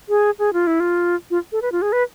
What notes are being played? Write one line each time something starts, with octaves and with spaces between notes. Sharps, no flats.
G#4
G#4
F4
E4
F4
F4
A4
B4
F4
G#4
B4